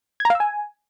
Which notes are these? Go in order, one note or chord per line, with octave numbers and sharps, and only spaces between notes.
G#6
A#5
F5
E6
G#5